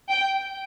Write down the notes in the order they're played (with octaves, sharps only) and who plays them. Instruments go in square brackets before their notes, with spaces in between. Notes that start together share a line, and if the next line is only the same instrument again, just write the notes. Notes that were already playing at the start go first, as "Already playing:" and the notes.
[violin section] G5